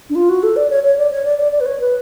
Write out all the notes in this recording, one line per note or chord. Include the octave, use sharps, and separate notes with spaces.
D4
F4
F#4
A4
D5
C#5
C#5
D5
C#5
D5
D5
D5
B4
C#5
B4